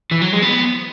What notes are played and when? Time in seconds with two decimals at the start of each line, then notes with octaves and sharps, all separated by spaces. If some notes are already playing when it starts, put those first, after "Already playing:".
0.11 E3
0.21 F#3
0.32 G#3
0.42 B3